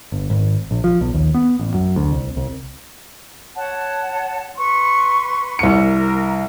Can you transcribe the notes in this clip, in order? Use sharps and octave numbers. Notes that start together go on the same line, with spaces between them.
G1
G#1
A#1
F3
B1
D#2
B3
A1
F#2
D2
C2
C2
C#5 F#5 A5
B4 C6 C#6
C2 A#4 C#7